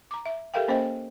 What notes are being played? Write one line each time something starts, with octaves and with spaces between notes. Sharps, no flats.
A#5 D6
E5
G4 A4 A#4 E5 F5 G5
A#3 C#4 C5 D#5 G5